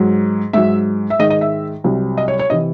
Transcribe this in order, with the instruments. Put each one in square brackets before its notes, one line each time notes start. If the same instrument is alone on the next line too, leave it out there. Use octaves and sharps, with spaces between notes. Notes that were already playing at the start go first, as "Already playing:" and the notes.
Already playing: [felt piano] G#2 F#3
G#2 F#3 E5
E5
G#2 D#3 G#3 D#5
D#5
E5
C2 C3 F#3
D#5
C#5
C#5
C3 E3 D#5